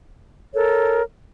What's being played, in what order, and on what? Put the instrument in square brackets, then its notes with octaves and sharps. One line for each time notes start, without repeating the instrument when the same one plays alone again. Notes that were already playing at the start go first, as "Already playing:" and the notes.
[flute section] A4 A#4 C#5